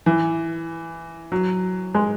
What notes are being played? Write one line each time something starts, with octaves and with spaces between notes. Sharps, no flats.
E3
F#3
G#3